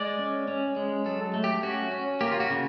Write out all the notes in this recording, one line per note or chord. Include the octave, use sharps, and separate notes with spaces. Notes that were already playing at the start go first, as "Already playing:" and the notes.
Already playing: G#3 D5
C#4
C#4
G#3
F#3 A4
A3
G4
C#4 F#4
C#4
A#3 G4
F4
F#4
C#3